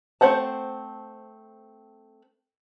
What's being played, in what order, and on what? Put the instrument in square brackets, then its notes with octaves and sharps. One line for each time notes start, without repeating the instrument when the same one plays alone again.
[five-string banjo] A3 C4 C5 F#5 A5